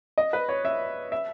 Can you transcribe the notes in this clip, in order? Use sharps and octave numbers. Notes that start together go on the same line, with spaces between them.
D#5
B4
C#5
E5
E5